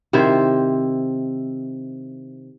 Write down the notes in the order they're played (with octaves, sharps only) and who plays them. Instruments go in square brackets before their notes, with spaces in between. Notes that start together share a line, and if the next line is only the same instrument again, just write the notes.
[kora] C3 D#3 E4 C5